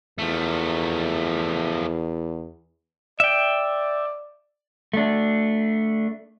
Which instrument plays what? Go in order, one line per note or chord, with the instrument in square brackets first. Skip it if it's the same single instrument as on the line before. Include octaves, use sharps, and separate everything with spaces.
[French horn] E2 [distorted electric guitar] F3 A3
[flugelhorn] D5 [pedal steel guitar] E5 G5
[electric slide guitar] A3 D4